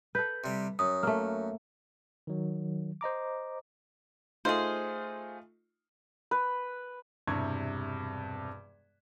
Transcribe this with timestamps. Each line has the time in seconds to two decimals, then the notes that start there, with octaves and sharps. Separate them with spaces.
0.15 A4 B4 G6
0.44 C3 G3
0.79 F#2 D#6
1.03 A3 A#3 F6
2.27 D#3 F#3
3.01 C5 D#5 A#5 D6
4.45 A3 D#4 F4 G#4 C5
6.31 B4
7.27 E1 G2 C3 E4 C#6 G#6